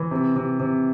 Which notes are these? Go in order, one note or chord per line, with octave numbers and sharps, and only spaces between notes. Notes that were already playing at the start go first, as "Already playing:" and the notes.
Already playing: E3
C3
C3
C3